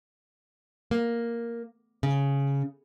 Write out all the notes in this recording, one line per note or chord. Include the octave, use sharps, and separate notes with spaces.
A#3
C#3